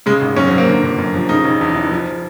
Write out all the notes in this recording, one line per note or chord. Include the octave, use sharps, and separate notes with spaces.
C#3 G#3
G#1
F#2 C#4
C4
F#3
A#3
D3
G1
F#2
F3
C#3 D#4
E1
E2
E3
F3